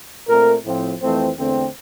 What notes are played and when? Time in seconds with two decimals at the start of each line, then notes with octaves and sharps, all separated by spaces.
0.28 A#2 A3 C4 A#4
0.64 A2 F3 C4
1.01 F2 E3 A3 C4
1.37 E2 D3 A3 C4